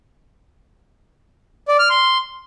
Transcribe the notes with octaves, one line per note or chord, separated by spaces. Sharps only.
D5
F6
C6